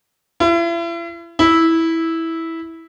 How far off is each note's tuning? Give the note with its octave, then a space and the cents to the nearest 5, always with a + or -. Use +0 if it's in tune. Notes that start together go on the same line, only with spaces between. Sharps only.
E4 +40
E4 -10